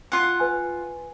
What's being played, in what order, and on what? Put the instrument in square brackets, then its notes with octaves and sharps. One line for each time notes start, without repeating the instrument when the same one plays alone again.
[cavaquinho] F4 F#5
[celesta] B4 G#5